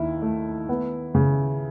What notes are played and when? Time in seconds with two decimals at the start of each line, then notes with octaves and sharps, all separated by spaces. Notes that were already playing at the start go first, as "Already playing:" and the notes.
Already playing: D#2 D#3 E4
0.22 A3
0.69 B3
1.15 C#3